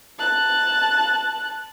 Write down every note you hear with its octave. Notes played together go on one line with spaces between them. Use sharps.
A5 F#6